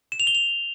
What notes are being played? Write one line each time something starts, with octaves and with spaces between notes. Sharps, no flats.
E7
F7
G7
F7